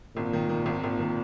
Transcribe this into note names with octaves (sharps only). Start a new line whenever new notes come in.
G#1 A#2
D#3
D#3
G#1
G#1 A#2
D#3